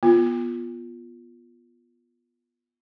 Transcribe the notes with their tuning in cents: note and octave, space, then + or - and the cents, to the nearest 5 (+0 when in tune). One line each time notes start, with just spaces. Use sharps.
B3 -20 F4 +0